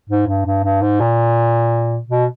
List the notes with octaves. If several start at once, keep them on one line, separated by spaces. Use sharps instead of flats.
G#2
G2
G2
G2
G#2
A#2
B2